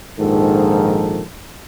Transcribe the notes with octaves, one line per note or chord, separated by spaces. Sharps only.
A#1 G#2 D#3 F3 A4